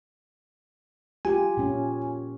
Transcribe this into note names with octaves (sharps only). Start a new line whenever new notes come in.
F4 G4 G#5
A#2 C#4